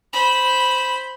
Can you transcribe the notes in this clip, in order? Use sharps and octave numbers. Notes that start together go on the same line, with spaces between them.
C5 B5